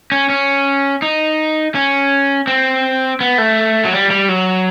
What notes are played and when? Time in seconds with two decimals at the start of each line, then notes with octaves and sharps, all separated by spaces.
0.12 C#4
0.29 C#4
1.02 D#4
1.75 C#4
2.47 C4
3.21 B3
3.38 A3
3.85 F#3
3.93 G3
4.10 G3
4.29 F#3